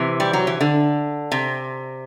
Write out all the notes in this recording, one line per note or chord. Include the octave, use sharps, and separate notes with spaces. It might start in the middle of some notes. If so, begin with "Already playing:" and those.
Already playing: C3 E3
G3
F#3
E3
D3
C3